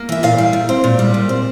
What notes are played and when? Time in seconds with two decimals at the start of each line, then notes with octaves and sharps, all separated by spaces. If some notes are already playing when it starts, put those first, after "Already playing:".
Already playing: A#3
0.09 E3 E5
0.23 A#2 F5
0.38 G3
0.53 A#2
0.69 C4
0.84 A#2
0.99 G3
1.14 A#2
1.29 C4